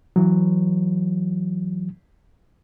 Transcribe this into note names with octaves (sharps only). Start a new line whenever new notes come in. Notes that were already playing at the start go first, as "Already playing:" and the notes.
E3 F#3